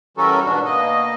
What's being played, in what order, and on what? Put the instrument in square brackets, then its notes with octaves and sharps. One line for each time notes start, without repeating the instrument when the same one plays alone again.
[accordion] E3 G3 C#4 F#4 A4 A#4
G#2 B2 D4 F#4
B2 A#3 D#5